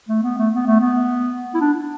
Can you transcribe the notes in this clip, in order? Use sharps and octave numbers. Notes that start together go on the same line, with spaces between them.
A3
B3
A3
B3
A3
B3
E4
D4